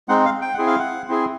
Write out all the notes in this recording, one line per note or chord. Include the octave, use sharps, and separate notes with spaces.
G#3 C4 D#4 F#5
F5
G5
C4 E4 G#4 F#5
F5
F#5
C4 E4 G#4